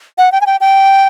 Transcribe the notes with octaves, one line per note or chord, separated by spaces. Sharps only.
F#5
G5
G#5
G5
G5